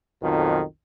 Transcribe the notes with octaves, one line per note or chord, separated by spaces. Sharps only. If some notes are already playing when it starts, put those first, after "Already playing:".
B1 F2 D#3 F3